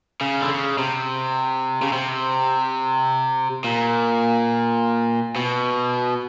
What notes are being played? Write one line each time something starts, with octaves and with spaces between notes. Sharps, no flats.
C#3
D3
C#3
C3
C#3
C3
A#2
B2